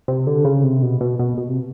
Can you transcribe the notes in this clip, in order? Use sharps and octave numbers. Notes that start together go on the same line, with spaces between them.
C3
D3
C#3
C3
B2
B2
B2
B2
C3